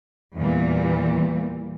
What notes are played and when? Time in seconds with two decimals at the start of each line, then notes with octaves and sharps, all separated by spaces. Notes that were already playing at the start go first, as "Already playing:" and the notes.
0.37 E2 A#2 E3 G3